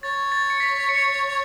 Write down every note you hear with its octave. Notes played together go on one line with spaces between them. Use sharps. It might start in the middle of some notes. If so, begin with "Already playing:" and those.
C#5 A6
A6
C#7
B6
C#7